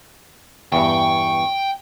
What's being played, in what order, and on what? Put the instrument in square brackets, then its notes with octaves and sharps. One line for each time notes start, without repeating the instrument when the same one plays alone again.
[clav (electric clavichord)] E2 G2 [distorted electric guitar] G5 [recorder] C#6